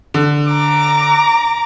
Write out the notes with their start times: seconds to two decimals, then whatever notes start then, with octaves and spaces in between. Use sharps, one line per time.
0.14 D3
0.50 A#5 D6